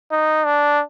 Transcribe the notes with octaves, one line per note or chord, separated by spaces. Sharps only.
D#4
D4